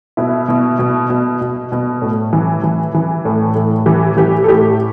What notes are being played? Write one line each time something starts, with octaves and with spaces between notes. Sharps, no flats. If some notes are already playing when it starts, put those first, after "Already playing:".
B2 E4
B2
B2
B2
B2
B2
A2
E3
E3
E3
A2
A2
E3 G4
E3 G4
A4
A2 G4